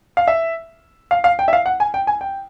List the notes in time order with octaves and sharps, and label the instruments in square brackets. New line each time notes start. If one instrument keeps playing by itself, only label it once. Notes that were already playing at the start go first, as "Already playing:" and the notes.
[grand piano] F5
E5
F5
F5
G5
E5
F5
F#5
G#5
G5
G#5
G5